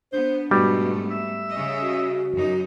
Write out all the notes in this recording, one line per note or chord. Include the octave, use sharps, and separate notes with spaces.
B3 D4 C5
G#2 B2 G3 A3 B3
E5
C#3 C#4 D#5
F#4
F#2 D#4